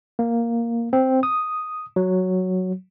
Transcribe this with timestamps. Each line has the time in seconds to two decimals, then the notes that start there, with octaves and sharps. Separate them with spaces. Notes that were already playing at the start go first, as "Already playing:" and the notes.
0.19 A#3
0.93 C4
1.23 D#6
1.96 F#3